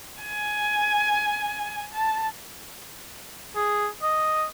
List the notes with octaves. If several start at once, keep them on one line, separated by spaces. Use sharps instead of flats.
G#5
A5
G#4
D#5